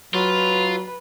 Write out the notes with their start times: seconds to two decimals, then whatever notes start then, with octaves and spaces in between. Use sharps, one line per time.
0.14 F#3 F4 B4